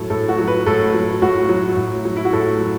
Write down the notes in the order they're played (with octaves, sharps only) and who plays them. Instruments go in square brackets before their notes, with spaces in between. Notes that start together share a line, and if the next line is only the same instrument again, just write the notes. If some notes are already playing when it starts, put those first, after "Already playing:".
Already playing: [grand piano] A2 F#3 A4
A2 A4
F#4
F#3
B4
A2 A4
F#3
A2 F#4
F#3
A2
F#3
E4
F#4
A2 A4
F#3